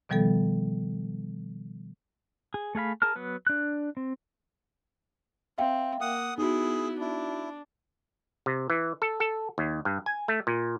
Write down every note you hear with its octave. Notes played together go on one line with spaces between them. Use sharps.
B2 D#3 F3 G3 B3 A4
G#4
A3 G#4 F5 B5
G#4 A#4 A5 F6
F#3 B3 B4
D4 F#6
C4
C4 E5 F5 G5
A#3 F#5 D#6
B3 D#4 E4 F#4 G#4
D4 E4
C3
E3
A4
A4
D#2
G2
G#5
A3
A#2